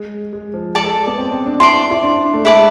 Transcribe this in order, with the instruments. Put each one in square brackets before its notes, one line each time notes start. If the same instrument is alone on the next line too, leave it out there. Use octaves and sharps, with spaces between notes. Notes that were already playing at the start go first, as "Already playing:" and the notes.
Already playing: [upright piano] G#3
G#3
F3
[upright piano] G#3 [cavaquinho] A4 D5 A5
[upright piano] G#3
B3
C4
C4
D4
[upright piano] E4 [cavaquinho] D5 A5 C6
[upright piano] E4
D4
A3
[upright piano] G#3 [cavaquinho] E4 B4 D5 A5